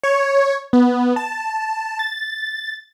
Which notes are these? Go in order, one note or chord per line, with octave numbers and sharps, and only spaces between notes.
C#5
B3
A5
A6